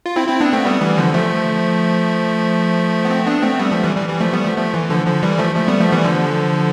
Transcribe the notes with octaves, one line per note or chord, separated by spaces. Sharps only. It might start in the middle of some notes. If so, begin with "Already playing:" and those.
F4
C4 E4
C4 E4
B3 D4
A3 C4
G3 B3
E3 G3
D3 F3
F3 A3
B3
A3 C4
B3 D4
A3 C4
G3 B3
F3 A3
E3 G3
E3 G3
E3 G3
F3 A3
G3 B3
F3 A3
F3 A3
E3
D3 F3
D3 F3
E3 G3
F3 A3
F3 A3
G3 B3
F3 A3
E3 G3
D3 F3